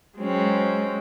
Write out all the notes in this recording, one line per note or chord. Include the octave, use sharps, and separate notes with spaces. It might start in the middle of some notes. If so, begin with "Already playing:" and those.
F#3 G#3 C4 C#4